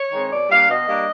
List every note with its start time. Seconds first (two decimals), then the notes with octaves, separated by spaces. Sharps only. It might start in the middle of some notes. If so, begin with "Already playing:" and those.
Already playing: C#5
0.12 D#3 G#3 C4
0.30 B2 D5
0.49 G3 A#3 D4 F5
0.69 B2 D#5
0.87 G3 A#3 D4